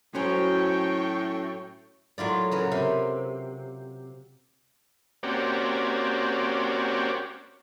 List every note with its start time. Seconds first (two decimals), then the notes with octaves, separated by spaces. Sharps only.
0.15 A2 F#3 C#4 F#4 C5 G5 C#6
2.18 A2 F#3 F4 D5
2.51 C#3 B3 A#4
2.71 C3
5.23 A#3 C4 C#4 F#4 G4 D5